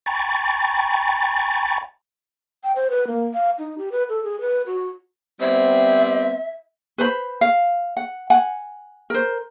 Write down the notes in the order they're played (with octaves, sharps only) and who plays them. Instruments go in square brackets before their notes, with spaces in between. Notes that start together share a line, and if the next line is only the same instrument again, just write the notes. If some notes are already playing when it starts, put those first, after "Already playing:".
[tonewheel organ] G5 G#5 A#5 B5 C#6 A6
[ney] G5
C5
B4
A#3
F5
D#4
G4
B4
A4
G#4
B4
F#4
[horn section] G3 B3 C4 [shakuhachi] E5
[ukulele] B4 C5 B5
F5
F#5
F#5 G#5
A#4 C5